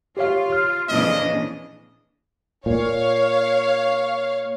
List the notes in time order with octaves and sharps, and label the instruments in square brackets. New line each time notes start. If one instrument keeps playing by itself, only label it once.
[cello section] F4 [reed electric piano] G4 C#5 F5
[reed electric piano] F6
[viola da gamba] F2 A#2 E3 [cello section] C#3 D4 [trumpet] D#5
[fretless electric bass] A#2 [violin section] C#5 F5